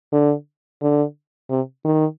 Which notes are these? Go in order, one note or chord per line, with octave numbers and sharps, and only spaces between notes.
D3
D3
C3
D#3